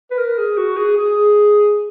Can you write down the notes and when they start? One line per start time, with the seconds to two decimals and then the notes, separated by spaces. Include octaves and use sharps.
0.11 B4
0.17 A#4
0.38 G#4
0.57 F#4
0.77 G#4
0.97 G#4